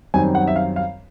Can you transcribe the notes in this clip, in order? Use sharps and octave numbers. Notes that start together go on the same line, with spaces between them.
F#2 D#3 G3 C4 G#5
F#5
E5
F5
F5